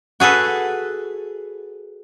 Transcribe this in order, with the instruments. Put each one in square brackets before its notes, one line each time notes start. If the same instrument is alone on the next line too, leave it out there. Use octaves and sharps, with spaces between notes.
[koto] F#4 G#4 A4 B4